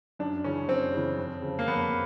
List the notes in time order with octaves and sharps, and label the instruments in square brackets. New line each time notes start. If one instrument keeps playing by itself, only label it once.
[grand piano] F#2 D4
C#3 E3 C#4
F#2 C4
C#3 E3
F2
C#3 F3
A#3
F2 B3